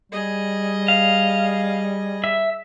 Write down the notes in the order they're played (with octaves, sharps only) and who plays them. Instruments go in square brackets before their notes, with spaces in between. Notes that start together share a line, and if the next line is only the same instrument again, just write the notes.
[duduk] G3 [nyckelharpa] G#4 D#5
[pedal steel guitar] F5
E5